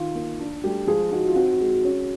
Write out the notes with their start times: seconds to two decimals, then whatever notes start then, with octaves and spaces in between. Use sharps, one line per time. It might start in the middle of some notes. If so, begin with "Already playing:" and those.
Already playing: D#3 F4
0.15 A#3
0.39 D4
0.63 G3 A3 G4
0.87 F3 G#3 G#4
1.11 D#4 F#4
1.28 F4
1.36 C4 F#4
1.60 G#3
1.85 C#4